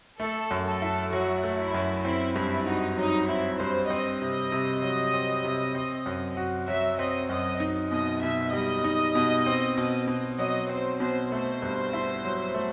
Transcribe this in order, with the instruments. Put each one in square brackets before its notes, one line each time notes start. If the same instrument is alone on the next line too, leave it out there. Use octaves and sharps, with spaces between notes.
[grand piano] A3 [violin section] A4
[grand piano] F#2
[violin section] A4
[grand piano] E4
[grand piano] F#3 [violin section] F#4
[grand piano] A3
[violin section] E4
[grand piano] F#2
[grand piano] C4 [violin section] E4
[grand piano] G2 [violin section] E4
[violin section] D#4 [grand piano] F#4
[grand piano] F#3 [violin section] D#4
[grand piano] C4 [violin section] E4
[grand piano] G2 [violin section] C5
[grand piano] C4 [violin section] D#5
[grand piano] C3
C3
F#3
C4
C3
C4
F#2
F#4
[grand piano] F#3 [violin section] E5
[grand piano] C4 [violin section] D#5
[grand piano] F#2 [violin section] D#5
[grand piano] D#4
[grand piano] B2 [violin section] D#5
[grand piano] B2 [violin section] E5
[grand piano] G3 [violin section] D#5
[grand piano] D#4
B2
C4
B2
B2
[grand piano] F#3 [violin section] D#5
[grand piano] C4 [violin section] C5
[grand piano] B2 [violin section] C5
[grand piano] A3 [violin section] C5
[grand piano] G2
E4
F#3
A3